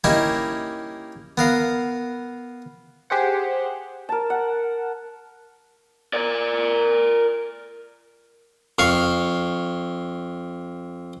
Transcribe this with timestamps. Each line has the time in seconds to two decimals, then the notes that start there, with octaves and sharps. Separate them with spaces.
0.04 A#3 C#4 D#4 E4 G4
1.38 B3 A#4 F5
3.10 G4 G#4 C5 F#5
4.09 A#4 A5
4.30 F#5
6.13 A#4 D5
8.79 F2 F5 C#6